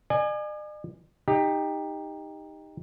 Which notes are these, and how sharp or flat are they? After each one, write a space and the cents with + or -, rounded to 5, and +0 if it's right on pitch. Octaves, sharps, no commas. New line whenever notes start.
D5 +45 G#5 +0
D#4 +0 G4 +20